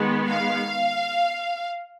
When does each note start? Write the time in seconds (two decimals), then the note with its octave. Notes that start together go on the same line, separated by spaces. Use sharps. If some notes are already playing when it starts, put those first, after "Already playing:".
Already playing: D#3 G#3 B3
0.27 F5